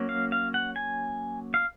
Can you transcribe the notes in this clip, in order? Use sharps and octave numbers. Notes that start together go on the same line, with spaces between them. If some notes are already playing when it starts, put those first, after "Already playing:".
Already playing: F#3 A#3 C#4
F5
F5
F#5
G#5
F5